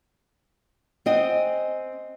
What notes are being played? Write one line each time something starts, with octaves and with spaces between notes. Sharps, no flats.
C4 C5 D#5 F#5 G#5